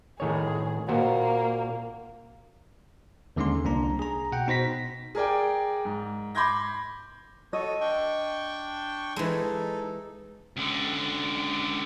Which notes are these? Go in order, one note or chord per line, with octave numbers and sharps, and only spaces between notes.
A2 D#3 G#4 C#5
A#2 A#3 F#4 C5
D#2 D3 G#3 C#4 D#4 C6
C2 A#3 D4 A#5
G#4 A#5
B2 F#5 G5
B2 D#4 C5 A#6 B6
G#4 A#4 D5 G5
G#2
B5 C6 D6 G6 G#6 A#6
F#4 A4 C#5 D#5
D4 G5 C#6
E3 G#3 D#4 A4
C#2 D3